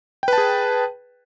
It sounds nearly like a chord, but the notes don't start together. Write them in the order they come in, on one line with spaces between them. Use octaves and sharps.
G5 B4 A5 G#4